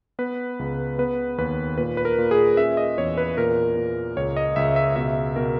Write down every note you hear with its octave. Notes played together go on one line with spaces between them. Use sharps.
B3 B4
C#2
B3 B4
D#2 B4
A#2 B4
B4
A#4
A#2
G#4
C#4 E5
D#5
E2 C#5
B4
A#2 A#4
A#2
C#2 C#5
D#5
C#2 E5
E5
B2 E5
B2 A#4